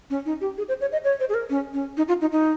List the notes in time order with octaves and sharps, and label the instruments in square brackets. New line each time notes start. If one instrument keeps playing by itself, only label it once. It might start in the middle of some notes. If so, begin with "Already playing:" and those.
[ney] C#4
D#4
G4
G#4
C5
C#5
D#5
C#5
C5
G#4
A#4
C#4
C#4
D#4
F4
D#4
D#4